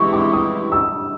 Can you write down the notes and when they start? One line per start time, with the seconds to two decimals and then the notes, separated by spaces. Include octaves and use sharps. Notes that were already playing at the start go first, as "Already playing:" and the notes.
Already playing: E3 G#3 C4 E4 G4 C#6
0.13 D6
0.33 D#6
0.72 E6